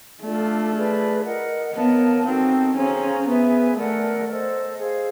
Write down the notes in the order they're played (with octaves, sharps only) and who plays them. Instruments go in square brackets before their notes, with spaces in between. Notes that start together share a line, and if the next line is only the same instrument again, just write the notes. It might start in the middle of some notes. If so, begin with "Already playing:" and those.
[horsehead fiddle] A3 [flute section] D4 F4 A4 D5
[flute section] F4 G#4 B4 D5
A#4 D#5 F#5
[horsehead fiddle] B3 [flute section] A#4 C#5 F5 A5
[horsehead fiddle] C4 [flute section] D#4 F#4 A4
[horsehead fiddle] C#4 [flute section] G#4 C5 F5 A#5
[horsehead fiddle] B3 [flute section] G#4 B4 E5 G#5
[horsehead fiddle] A3 [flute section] A#4 D5 F#5
[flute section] A4 C5 D#5
G#4 C5 F5